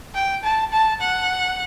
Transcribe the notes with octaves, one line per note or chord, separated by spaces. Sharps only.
G5
A5
A5
F#5